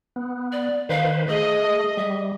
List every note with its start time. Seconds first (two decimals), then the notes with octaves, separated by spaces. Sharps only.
0.16 B3
0.52 D5
0.89 D#3 B4 C5 F5
1.29 A3 G#4 D#5
1.97 G3 E5